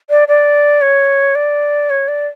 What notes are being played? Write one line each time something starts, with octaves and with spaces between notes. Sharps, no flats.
D5
D5
C#5
D5
C#5
D5